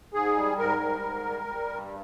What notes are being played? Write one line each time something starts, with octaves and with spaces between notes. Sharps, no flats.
G#2 G#4
G3
G#2 A#4
G3
G#2
G3
G3
G2